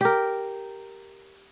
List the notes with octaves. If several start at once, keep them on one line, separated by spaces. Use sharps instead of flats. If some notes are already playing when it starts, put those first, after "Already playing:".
G4 A#4